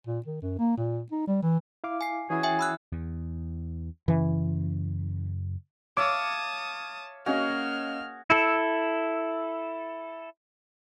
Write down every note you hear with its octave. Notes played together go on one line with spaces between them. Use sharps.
A#2
D#3
F#2
A#3
A#2
D#4
G3
E3
E4 F5 D6
G#5 C7
E3 C#4 E4 F#4 G#4
E5 G5 G#5
B5 E6 F#6
E2
F#2 C#3 E3 C#4
C#5 E5 F5 A5 D6 D#6
A#3 C#4 F#4 G#4 D#5 F5 F6
E4 A4